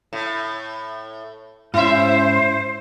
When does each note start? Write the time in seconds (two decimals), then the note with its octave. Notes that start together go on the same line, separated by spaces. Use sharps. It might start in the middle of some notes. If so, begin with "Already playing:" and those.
0.13 A2
1.74 G#2 C#4 E4 C5 E5